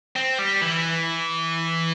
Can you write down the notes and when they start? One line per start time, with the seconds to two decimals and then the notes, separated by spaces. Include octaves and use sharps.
0.16 C4
0.38 G3
0.61 E3